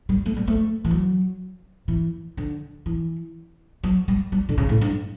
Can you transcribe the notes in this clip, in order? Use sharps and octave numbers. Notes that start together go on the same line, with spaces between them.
G3
A3
G3
A3
E3
F#3
E3
D3
E3
F#3
G3
G3
D3
C#3
A2
G2